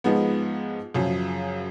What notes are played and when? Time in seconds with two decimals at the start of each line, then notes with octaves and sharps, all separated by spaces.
0.04 G#2 F3 G#3 B3
0.94 F#2 C#3 F3